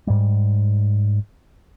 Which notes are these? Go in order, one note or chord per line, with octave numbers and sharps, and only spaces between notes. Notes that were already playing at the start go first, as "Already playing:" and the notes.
G#2 G3